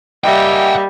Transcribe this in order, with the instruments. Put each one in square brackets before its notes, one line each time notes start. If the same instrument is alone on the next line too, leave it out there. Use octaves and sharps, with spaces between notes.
[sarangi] G3 [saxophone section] A#3 D#4 E5 [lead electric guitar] F#5 G5